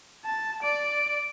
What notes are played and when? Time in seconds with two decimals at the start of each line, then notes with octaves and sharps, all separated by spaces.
0.25 A5
0.62 D5 D7